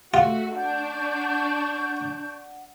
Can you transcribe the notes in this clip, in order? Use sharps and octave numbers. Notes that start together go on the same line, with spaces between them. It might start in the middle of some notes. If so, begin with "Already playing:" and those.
A3 F4 F#4 E5 F#5
D4 C#6 G6